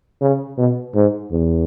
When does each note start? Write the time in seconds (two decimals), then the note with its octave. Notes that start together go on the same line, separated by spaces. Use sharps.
0.21 C#3
0.58 B2
0.95 G#2
1.31 E2